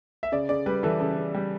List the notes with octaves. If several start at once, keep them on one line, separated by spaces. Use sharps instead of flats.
E5
C#3 D5
C#3 D5
G3 B4
E3 A4
C#3 A4
C#3
G3